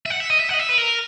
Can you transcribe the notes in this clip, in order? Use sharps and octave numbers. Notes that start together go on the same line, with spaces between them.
E5
F#5
E5
D#5
E5
F#5
D#5
E5
B4
A#4